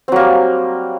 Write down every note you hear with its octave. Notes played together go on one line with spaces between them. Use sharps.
F#3 G3 A#3 C4